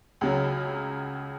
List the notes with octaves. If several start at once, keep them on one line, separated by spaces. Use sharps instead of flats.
C#2 C#3 F#3